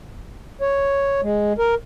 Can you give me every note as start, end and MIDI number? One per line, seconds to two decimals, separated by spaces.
0.61 1.21 73
1.22 1.53 56
1.58 1.75 70